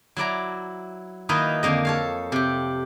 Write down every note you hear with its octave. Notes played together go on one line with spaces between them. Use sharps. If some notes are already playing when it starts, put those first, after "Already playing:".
F#3 E4 D5 A#5
D#3 A#3 D#4 E4 B4 D#5
F2 D3 A#3 D#5
A4 C#5 F5
C3 G4